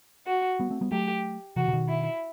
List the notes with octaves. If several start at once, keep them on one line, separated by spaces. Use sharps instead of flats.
F#4
G3 B3
A3 C4
G3 B3
F#3 A3 G4
C3 E3 F#4
C3
B2 D#3
E4